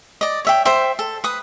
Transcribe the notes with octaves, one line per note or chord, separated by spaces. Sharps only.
D5 D#5
C#5 E5 G5
C5 E5 G5
A4
B4 D#6